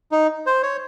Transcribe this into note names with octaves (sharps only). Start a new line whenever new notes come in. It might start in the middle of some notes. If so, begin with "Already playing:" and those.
D#4
C5
C#5